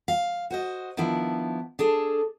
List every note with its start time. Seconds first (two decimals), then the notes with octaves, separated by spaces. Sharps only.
0.08 F5
0.51 F#4 C5 D#5
0.97 D#3 F3 B3 D4 E4
1.79 D4 G#4 A4